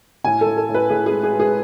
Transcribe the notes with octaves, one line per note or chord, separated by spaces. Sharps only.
A2 G#5
A4
A2
A4
A2
B4
A2 G#4
G#4
G#3
G#4
G#3
G#4